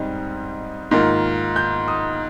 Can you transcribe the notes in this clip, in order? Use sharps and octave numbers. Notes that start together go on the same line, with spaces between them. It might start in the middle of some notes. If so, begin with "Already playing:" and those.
Already playing: G#2 G3 C4 D#4
G#2 D#3 A#3 F4
G6
D#6